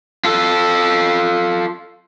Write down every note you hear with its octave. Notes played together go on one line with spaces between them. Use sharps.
F4 A4